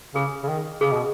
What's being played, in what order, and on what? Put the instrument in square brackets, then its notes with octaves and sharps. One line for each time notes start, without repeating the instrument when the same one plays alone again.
[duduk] C#3 [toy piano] G#4
[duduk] C#3
D#3
[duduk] C#3 [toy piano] G#4
[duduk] B2